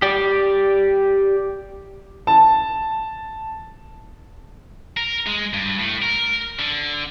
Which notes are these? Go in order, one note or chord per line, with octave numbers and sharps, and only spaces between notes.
G4 D5
A5
A#4
G#3
G2
A2
A#4
D3